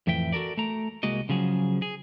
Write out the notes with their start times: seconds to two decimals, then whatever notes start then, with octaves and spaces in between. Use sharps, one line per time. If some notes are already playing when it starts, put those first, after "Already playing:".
0.07 F2 A2 E3 E5 G5
0.32 F#4 A4 A#4 D5
0.57 A3 A#5
1.03 C2 G#3 A#3 F#4 D#5
1.29 C#3 F3 F#3 G#4
1.82 G#4